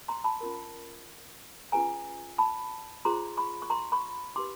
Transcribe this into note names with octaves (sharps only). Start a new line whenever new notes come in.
A#5 C6
A5 B5
C#4 F4 A#4
C#4 F4 G#4 B4 G#5 A#5
A5 B5
F4 G#4 C5 A#5 C6
B5 C#6
C#6
A#5 C6
B5 C#6
D#4 G4 B4 C6 D6